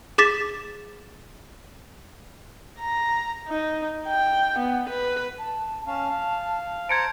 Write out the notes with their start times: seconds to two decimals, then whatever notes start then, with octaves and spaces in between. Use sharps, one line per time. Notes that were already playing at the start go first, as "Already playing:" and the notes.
0.18 G#4 D6 A6 B6 E7
2.79 A#5
3.49 D#4
4.08 G5
4.59 B3
4.90 B4
5.39 A5
5.87 C#4 F5 A5
6.09 F5
6.89 C5 A5 A#5 G#6 C#7 D7